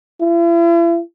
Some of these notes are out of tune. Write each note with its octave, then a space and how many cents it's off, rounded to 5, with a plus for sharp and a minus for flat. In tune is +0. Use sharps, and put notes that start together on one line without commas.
E4 +45